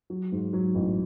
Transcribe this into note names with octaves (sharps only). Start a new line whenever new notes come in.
F#3
G#2
F#3
A1